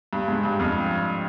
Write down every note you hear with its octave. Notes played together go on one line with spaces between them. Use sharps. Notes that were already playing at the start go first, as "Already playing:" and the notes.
G2
G#2
G2
F2